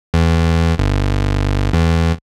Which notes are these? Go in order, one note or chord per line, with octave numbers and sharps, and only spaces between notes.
E2
G1
E2